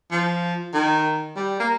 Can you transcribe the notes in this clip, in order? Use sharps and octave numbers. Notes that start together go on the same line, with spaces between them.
F3
D#3
G3
A#3